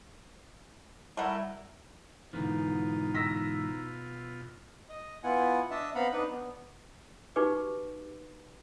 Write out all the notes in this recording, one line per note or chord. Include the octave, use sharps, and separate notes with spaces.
G3 A3 E4 A#4 F#5
G#2 B2 D3 E3 D#4 F4
E6 A#6 B6
D#5
B3 E4 F4 F#5 G#5
D4 D#5 E5 A5
B3 C4 F5 F#5 A#5 B5
D4 D#4 B4
B3
D#4 F#4 G4 B4 C#6 D6